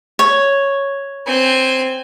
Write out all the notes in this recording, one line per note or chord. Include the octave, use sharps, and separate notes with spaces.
C#5
C4 G#5